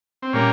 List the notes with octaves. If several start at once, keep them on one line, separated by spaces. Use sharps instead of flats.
C4
A#2 G3 A#3 C#4